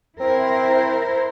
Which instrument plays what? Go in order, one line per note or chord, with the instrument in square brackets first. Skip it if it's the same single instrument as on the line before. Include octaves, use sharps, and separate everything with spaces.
[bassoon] C4 [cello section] E4 A#4 C5